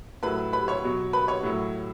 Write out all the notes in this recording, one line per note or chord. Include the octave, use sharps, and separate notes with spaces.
A2 F#3 B4 B5
B4 B5
C#5 C#6
B2 F#3
B4 B5
C#5 C#6
A2 F#3